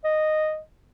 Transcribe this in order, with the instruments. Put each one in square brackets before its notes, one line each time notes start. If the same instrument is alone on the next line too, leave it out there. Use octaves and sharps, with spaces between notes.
[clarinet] D#5